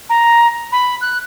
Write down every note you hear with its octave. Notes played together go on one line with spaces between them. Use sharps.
A#5
B5
F#6